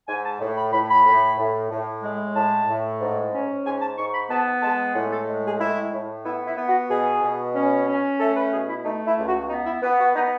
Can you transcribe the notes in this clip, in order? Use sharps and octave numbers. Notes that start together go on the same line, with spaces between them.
G#2 G#5
A5
A2
B5
A2 B5
B5
A2
A2
A2
G#3
A2 A5
A2
G#2
C#4
G#2 G#5
A5
G#2 C#6
B5
B3 A5
G#3 A5
A2 F#5
A4
G#3
G#4
A2 E4
A2
B3 E4
E4
B3
F#4
B2 G#4
B2
C#4
C#4
A3 A4
B4
B2 G#4
E4
A3 D#4
E4
C#2
F#4
B3 D#4
E4
B3
F#4
B3 D#4